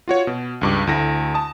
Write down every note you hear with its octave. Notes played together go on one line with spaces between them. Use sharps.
F4 F#4 C#5
B2
C#2 G2 D6
D2 A3 E4 A#6
A5 D#6